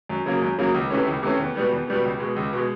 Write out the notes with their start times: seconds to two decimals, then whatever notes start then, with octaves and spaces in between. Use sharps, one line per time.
0.09 F#2
0.26 C#3 F#3 A#3
0.42 F#2
0.58 C#3 F#3 A#3
0.74 C#2
0.90 C3 E3 A3 C#4
1.07 C#2
1.23 C3 E3 A3 C#4
1.39 E2
1.55 B2 G3 B3
1.72 E2
1.88 B2 G3 B3
2.04 C#2
2.20 B2 G#3
2.36 C#2
2.53 B2 G#3